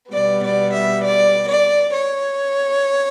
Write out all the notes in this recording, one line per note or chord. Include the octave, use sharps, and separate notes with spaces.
B2 G3 B3 D5
D5
E5
D5
D5
C#5